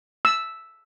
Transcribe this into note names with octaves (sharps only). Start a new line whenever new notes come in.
E6